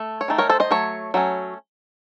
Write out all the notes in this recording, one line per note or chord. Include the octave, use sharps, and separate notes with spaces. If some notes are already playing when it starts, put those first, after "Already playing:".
Already playing: A3
C#5
D#3 A3 D#4
A#4 C#5
A4 C5
C5 D#5
F#3 A3 C#5
F#3 A3 C#4